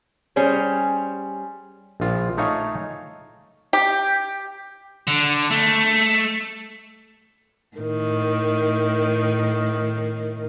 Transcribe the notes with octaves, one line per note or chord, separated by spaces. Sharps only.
G3 C#4 G#4 C5
A#1 F4
A3 D#4 C#5 F5 G#5
G4
D3
A3
A2 D#3